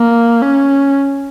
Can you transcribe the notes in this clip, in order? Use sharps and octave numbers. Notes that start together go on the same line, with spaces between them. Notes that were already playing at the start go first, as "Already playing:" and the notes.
Already playing: A#3
C#4